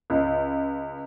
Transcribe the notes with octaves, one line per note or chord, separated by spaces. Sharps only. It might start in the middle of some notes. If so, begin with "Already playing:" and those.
C#2